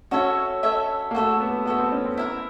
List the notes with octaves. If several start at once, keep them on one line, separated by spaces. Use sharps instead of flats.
C#4 F#4 A4 C#5 E5
F#4 A4 C#5 E5
A#3
A3 F#4 A4 C#5 E5
B3
B3 F#4 A4 C#5 E5
C4
C#4
C4
E4 G4 A#4